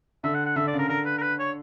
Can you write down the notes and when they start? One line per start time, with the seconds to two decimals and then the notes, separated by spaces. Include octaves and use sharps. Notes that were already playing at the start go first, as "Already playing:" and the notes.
0.24 D3 E5
0.34 F#5
0.46 F#5
0.56 D3 E5
0.67 D5
0.73 C#3 A#4
0.89 D3 A#4
1.05 B4
1.18 A#4
1.22 B4
1.39 C#5